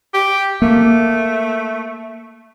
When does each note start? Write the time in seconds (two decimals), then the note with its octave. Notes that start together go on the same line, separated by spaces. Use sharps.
0.14 G4
0.62 A3 A#3